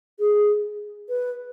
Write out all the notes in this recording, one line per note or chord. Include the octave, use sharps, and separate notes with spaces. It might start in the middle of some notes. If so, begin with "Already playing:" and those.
G#4
B4